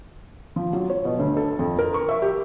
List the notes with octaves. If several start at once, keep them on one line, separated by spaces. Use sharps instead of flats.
F3
F#3
C#5
B2
D2
A4
F2
A#4
C#6
E5
G4